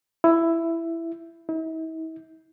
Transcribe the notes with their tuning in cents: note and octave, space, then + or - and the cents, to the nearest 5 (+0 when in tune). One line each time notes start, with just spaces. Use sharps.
E4 +10
E4 -45